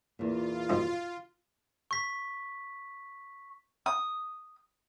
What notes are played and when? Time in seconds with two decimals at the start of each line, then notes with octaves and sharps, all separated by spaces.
0.19 E2 A#2 F4
0.69 F2 B2 D#4
1.91 C#6 B6
3.86 D#6